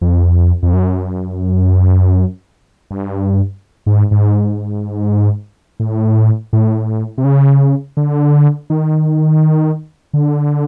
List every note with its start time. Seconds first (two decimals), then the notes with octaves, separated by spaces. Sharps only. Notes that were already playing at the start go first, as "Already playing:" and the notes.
0.01 F2
0.63 F2
0.73 F#2
2.91 G2
3.86 G#2
4.11 G#2
5.80 A2
6.53 A2
7.18 C3
7.24 C#3
7.97 D3
8.70 D#3
10.13 D3